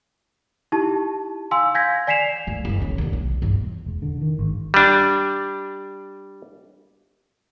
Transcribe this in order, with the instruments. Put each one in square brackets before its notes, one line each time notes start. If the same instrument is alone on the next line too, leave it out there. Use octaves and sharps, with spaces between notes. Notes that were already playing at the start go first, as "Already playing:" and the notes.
[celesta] D#4 E4 G4 A5
F5 G#5 C6 E6
F5 G#5 G6 G#6 A#6 B6
D5 G#5 B6 C7 E7 F7
[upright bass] D2 G#2
F#1 E3
F#2 C#3
D#2 D3
B1
E2 G2
[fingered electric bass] E1
D3
D#3
G#1
[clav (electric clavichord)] G3 D4